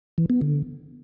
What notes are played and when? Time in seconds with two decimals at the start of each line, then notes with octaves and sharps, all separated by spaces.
0.18 E3
0.30 B3
0.41 D3